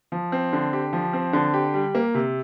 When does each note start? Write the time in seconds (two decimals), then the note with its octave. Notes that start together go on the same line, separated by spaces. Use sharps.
0.12 F3
0.32 C4
0.53 D3
0.73 G4
0.93 F3
1.13 C4
1.33 D3
1.54 G4
1.74 G3
1.95 A#3
2.14 C3